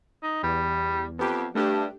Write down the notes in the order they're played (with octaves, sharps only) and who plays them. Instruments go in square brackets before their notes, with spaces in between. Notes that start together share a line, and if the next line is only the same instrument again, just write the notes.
[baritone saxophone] D#4
[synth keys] E2 [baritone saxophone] G3
[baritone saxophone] F2 [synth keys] B3 G4
[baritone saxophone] G2 [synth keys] A3 D4 G4